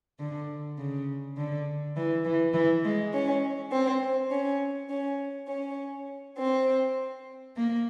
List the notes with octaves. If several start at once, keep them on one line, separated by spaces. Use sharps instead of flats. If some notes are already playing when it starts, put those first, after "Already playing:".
D3
C#3
D3
E3
E3
E3
G#3
C#4
C4
C#4
C#4
C#4
C4
A#3